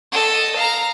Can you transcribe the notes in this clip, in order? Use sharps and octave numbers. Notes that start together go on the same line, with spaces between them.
A4 D#5
F5 A#5